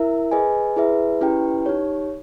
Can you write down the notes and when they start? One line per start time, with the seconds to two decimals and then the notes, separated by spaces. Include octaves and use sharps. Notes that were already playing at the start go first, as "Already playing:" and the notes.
Already playing: E4 A#4 E5
0.31 G#4 B4 D#5 G#5
0.76 E4 G#4 B4 E5
1.21 C#4 E4 G4 B4 G5
1.66 D#4 G4 C#5